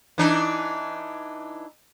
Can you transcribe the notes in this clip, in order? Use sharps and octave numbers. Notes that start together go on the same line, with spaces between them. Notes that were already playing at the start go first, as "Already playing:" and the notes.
E3 D4 D#4